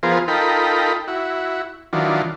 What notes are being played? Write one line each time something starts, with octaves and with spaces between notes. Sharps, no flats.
F3 B3 F4 G#4 A#4 C5
D#4 F4 A4 A#4 G5 B5
E4 F#4
D#3 E3 F#3 D4 F4